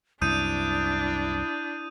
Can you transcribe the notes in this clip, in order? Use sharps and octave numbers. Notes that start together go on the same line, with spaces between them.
C2 F#2 D4 E4 D#6 G6 D#7